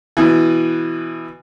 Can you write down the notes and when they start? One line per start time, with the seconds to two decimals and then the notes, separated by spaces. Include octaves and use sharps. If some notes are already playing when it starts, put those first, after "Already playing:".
0.17 B2 E3